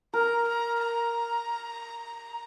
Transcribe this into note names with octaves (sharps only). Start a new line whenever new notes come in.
A#4 A#5
A#5
A#5